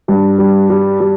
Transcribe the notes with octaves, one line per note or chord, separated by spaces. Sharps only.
G2 G3
G3
G3
G3